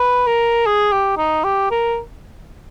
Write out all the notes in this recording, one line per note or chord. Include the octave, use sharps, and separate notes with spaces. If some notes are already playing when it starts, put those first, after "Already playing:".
Already playing: B4
A#4
G#4
G4
D#4
G4
A#4